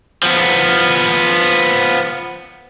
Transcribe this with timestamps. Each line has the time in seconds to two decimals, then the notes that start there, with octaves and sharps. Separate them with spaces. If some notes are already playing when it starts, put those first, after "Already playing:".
0.23 F3 B3